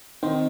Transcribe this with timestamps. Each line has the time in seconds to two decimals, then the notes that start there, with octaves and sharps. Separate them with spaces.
0.23 D#3 C4 C5